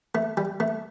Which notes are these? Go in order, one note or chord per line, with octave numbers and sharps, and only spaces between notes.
A3
G3
A3